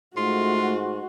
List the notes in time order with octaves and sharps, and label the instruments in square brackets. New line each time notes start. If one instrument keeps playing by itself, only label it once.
[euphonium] G#2 [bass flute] A3 [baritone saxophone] F4 [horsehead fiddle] F#4